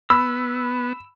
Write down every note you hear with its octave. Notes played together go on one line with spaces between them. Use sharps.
B3 B5 E6